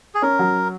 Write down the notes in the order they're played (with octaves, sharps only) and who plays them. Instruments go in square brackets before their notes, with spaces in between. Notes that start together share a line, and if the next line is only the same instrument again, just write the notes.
[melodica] G#4
[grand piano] C#4 [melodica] A#4
[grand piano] F#3